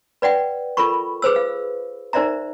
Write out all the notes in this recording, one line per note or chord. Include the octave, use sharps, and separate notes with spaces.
B4 D5 F#5 G5
F4 A4 A#4 B5 C#6
G#4 B4 C5 E6
F5
D#4 A#4 C5 D5 E5 A#5